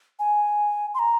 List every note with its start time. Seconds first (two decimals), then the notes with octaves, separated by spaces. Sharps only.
0.19 G#5
0.94 C6
0.99 A#5